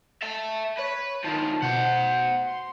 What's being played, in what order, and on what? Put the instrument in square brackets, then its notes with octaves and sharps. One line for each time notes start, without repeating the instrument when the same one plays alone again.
[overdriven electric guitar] E5 A5
[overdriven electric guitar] B4 [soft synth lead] C#5
[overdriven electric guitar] D#3 F3 [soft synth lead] A5
[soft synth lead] B2 [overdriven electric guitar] C5 F#5
[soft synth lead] C6